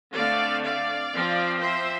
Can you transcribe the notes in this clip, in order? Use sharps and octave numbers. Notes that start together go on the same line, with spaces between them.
D3 A3 C4 D5 F5
D5 F5
F3 C4
C5 E5